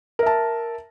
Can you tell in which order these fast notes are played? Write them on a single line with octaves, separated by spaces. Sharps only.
A#4 E5 A5